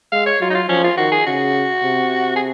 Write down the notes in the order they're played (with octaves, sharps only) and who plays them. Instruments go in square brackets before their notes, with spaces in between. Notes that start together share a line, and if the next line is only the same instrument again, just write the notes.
[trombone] G#3 [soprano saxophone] F5
[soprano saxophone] C#5
[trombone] F#3 [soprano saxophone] F4
[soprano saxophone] D#4
F4
[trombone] F3 [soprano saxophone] C#4
[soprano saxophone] F4
[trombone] D#3 [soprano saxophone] F#4
[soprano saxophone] G#4
[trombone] C#3 [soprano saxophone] F#4
[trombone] C3
[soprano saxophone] G#4